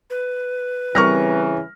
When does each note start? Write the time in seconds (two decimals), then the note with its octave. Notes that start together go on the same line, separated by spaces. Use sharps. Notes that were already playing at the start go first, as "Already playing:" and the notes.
0.10 B4
0.95 C#3 E3 G3 C4 A#4 C#6 F6 A#6